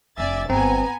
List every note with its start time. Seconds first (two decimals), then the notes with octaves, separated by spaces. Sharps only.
0.18 F1 D4 D5 E5 G#5 A6
0.50 G1 B3 C4 G#5 A#5